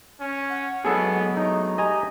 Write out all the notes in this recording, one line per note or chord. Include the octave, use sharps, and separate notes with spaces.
C#4
F#5
B2 F#3 G#3 B3 G#4 A4
A3 D#4 A#5
G4 D#5 G#5 A#5